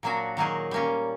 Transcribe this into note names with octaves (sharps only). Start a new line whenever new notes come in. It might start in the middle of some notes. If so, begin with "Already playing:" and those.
A#2 F#3 A#3 D4 F#4
D#3 F#3 A#3 D#4 G#4
G3 A#3 C#4